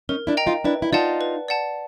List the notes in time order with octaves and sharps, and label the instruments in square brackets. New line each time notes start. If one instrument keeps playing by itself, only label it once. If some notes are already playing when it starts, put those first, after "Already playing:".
[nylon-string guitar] C#4 D#4 [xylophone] A#4
[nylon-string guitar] D4 E4
[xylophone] D#5 G5 A#5
[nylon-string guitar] D#4 F4
[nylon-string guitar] D4 E4 [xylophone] B4
[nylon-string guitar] E4
[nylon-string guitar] D#4 F4 [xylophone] D5 F#5 A5
[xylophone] B4
D5 F#5 A5